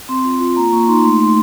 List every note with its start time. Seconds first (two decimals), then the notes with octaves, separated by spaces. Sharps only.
0.09 C4 C6
0.24 F4
0.40 F4
0.57 A#3 A#5
0.72 A#3 C#6
0.88 D#4 C6
1.04 A3 C6
1.20 A3 C6